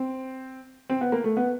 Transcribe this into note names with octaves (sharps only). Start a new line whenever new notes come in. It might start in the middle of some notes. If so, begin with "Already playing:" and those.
Already playing: C4
C4
B3
A#3
A3
B3